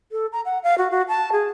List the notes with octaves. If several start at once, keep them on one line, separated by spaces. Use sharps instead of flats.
A4
A#5
F#5
F5
F#4
F#4
A5
G#4